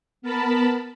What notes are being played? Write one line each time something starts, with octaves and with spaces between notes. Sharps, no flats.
B3 A#4 A5 B5